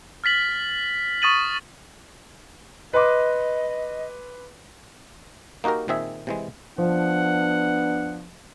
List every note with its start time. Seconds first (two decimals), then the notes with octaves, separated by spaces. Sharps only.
0.24 F6 A6 B6 F#7
1.22 C#6 D#6 A6 D#7 F#7
2.93 B4 D#5 C6 D6
5.64 A#3 D#4 F#4 G4 A#4
5.88 A#2 D#3 C4 G#4 E5
6.27 C3 E3 G#3
6.78 F3 B3 D4 F#5